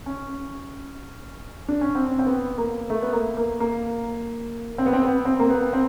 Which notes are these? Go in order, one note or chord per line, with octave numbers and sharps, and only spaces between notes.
C#4
D4
C#4
C4
C4
B3
A#3
A3
B3
A#3
A#3
A#3
C4
B3
C4
B3
C4
A#3
B3
C4